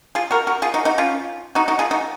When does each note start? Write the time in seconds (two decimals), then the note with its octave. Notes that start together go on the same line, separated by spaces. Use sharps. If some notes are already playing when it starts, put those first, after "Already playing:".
0.15 F4 G#4
0.31 F#4 A#4
0.47 F#4 A#4
0.62 F4 G#4
0.74 D#4 F#4
0.85 D#4 F#4
0.98 C#4 F4
1.55 D#4 F#4
1.68 D#4 F#4
1.79 F4 G#4
1.91 D#4 F#4